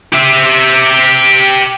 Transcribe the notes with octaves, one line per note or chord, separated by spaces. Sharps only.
G4 E5